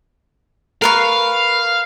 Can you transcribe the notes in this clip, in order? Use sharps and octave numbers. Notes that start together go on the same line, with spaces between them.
A#4 B4 F5 C#6